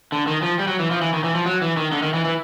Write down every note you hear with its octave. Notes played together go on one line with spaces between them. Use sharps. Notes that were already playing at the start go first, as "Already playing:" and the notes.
D3
D#3
F3
G3
F#3
E3
F3
E3
D#3
E3
F3
F#3
E3
D#3
D3
D#3
E3
E3